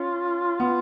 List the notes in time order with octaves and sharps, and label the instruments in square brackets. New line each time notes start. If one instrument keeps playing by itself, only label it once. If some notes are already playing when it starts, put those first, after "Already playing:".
Already playing: [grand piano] C#4 [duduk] F4
[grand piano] B3 [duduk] F4